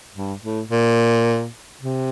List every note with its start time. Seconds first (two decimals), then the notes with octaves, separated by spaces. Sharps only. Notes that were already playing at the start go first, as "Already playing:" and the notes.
0.14 G2
0.42 A2
0.70 A#2
1.81 C3